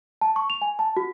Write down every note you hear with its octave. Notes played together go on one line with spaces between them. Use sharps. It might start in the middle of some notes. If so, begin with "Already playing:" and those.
A5
C#6
F7
G#5
A5
F#4